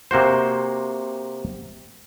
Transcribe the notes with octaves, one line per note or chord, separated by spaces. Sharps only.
C3 A#3 F#4 C5